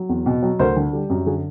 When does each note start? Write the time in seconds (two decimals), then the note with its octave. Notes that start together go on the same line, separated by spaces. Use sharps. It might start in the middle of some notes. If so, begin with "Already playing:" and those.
Already playing: F#3
0.09 E2
0.26 B2
0.42 F#3
0.59 D2 A#4 C5
0.76 D3
0.93 G3
1.10 F#2
1.26 D3 F#4 G#4